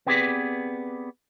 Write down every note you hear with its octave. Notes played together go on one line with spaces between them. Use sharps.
B3 C4 G4 G#4 B4 D5